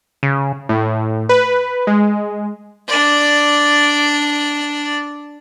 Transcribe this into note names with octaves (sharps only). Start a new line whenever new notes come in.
C#3
A2
B4
G#3
D4 D5